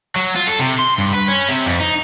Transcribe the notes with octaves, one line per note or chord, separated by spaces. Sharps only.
F#3
F4
A4
C3
C6
G2
B4
C#4
C3
F2
D#4